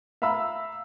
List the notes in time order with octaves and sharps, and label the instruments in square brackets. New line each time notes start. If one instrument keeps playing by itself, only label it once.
[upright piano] E5 F5 A#5 B5 E6